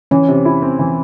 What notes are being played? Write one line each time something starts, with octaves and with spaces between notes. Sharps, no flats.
E3 C#4
C3
E4
C4
E3